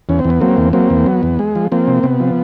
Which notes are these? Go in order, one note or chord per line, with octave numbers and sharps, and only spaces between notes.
E2 C#4
C4
E2
B3
F#3 A#3 C4
E2
F#3 A#3 C4
E2
F#3 B3
E2
G#3
F3
F3 A#3 C4
C3
C3 B3
F3